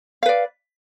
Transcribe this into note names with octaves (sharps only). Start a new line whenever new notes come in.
B4 D5 F5